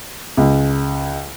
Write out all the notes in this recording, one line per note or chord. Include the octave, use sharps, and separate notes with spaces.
C#2